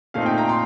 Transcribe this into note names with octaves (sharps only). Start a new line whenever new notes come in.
A#2 A3 C4 D#4 F5
G5
A#5
C6